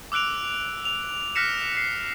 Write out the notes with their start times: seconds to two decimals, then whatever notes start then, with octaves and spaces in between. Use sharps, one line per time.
0.12 D6 E6 F#6 D7 F7
0.85 F7
1.35 F6 F#6 A#6 B6 C#7 E7
1.77 C7